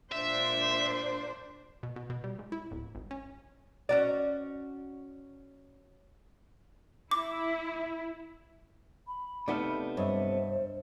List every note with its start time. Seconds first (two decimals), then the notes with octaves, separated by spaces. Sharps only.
0.12 A#2 D4 C5 E5
1.83 B2
1.96 B2
2.10 B2
2.24 G3
2.39 G#2
2.52 E4
2.71 D1
2.95 G#1
3.11 C#4
3.89 C#4 F#4 D5
7.11 E4 D6
9.07 B5
9.48 C3 A3 B3 D#4 A4 D5 F6
9.97 G2 C5 C#5 D#5 E5